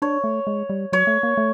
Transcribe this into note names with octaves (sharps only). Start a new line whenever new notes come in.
D4 C#5
A3
G#3
G3
F#3 C#5
A3
A#3
A3